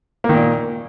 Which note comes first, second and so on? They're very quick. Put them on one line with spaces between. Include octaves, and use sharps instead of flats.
A#3 D#3 A#2